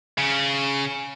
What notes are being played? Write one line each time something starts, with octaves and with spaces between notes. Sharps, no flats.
C#3